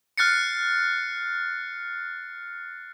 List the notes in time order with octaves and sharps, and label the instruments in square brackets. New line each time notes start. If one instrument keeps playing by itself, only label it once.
[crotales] F6 F#6 A6 C7 C#7